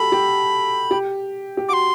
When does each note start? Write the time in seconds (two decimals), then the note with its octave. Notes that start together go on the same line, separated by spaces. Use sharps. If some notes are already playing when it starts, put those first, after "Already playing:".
Already playing: F#4 G4 A4 B5
0.12 G4
0.91 G4
1.57 G4
1.69 F#4 C6 D6